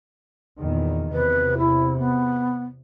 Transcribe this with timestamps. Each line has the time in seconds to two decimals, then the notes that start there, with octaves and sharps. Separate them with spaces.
0.61 E2 A#2 D#3
1.12 E2 C3 B4
1.58 E4
1.99 B3